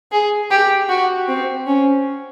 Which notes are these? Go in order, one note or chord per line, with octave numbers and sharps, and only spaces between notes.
G#4
G4
F#4
C4
C#4